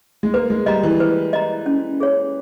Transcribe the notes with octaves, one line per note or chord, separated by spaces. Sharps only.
G#3
A#3 B4
G#3
G3 D#5 A#5
E3
B4
D#5 A#5
C#4
G#4 C#5